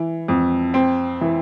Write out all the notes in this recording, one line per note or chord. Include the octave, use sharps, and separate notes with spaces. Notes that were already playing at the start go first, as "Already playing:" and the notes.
Already playing: E3
F2
C4
E3